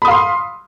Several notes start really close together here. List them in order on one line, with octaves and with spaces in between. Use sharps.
B5 D#6 F5 C6